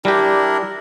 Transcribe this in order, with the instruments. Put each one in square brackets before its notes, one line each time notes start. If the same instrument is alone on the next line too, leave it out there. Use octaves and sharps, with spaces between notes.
[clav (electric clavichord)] G3 G4 [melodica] D4 E4 A#4